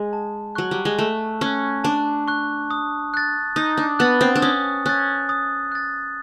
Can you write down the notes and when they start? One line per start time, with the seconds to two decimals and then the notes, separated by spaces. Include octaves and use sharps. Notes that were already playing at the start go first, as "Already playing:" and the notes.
Already playing: G#3
0.13 A5
0.55 F#3 C#6 F#6
0.71 G3
0.85 G#3
0.99 A3 A5
1.41 C#4 C#6 F#6
1.84 D4 A5
2.28 C#6 F#6
2.71 D#6
3.14 F#6 A6
3.56 D#4 D#6
3.77 D4
3.99 B3 F#6 A6
4.21 C4
4.36 D4
4.42 C#4 D#6
4.86 C#4 F#6 A6
5.29 D#6
5.72 F#6 A6